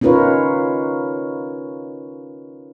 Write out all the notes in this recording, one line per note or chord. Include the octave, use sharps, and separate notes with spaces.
C#4 D#4 F4 A#4 B4 C#5